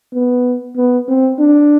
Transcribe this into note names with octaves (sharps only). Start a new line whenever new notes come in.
B3
B3
C4
D4